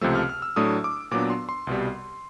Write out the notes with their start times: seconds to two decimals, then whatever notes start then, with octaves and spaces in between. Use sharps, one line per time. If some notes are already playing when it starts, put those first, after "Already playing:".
0.01 C#2 C3 F3 A3 E6
0.15 F6
0.29 F6
0.42 E6
0.56 A2 F#3 A3 D4 D#6
0.84 D6
1.11 A#2 F#3 B3 D4 D6
1.30 C6
1.49 C6
1.67 C2 B2 G3